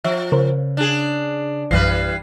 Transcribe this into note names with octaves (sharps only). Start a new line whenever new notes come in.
F3 E5
C#3 A#4 C5
D4 G#4
A#1 F#2 E3 G3 B4 C7